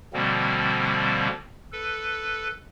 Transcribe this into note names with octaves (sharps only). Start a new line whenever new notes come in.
B2 D3 F3 G3 A#3 C4
A4 B4